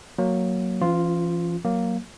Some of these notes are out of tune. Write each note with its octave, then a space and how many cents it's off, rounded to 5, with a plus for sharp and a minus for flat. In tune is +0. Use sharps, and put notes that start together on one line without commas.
F#3 +0 A#3 +0
F3 -45 C#4 -10 F4 +0
F#3 +0 A#3 +0